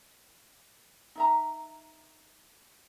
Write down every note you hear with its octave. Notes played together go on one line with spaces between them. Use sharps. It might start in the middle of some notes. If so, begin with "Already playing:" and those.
D#4 E5 A#5